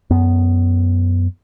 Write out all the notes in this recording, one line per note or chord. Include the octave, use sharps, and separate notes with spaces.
F#2 B3